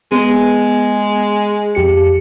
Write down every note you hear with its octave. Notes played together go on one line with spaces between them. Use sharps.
G#3 B3
F2 G4 C#7